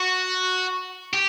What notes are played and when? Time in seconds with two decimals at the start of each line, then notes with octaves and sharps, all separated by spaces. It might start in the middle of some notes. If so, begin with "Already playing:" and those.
Already playing: F#4
1.13 G4